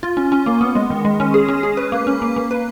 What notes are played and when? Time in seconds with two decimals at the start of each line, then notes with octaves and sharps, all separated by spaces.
0.03 F4
0.17 C#4
0.32 C#4
0.46 A#3
0.61 B3
0.75 G#3
0.90 D#3
1.05 G#3
1.20 C#4
1.34 G#4
1.48 C#4
1.63 G#4
1.77 B4
1.92 A#3
2.07 C#4
2.22 A#3
2.36 A#3
2.51 B4